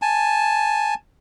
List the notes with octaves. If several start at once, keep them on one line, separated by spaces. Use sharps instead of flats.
G#5 A5